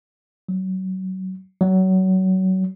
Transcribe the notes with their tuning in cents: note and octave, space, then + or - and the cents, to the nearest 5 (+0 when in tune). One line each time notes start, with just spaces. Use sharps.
F#3 +25
F#3 +25